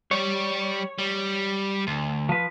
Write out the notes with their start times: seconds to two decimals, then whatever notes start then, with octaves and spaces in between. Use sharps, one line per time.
0.11 G3 C#5 D5
0.98 G3
1.87 D2
2.29 F3 B4